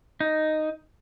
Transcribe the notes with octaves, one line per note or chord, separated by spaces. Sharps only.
D#4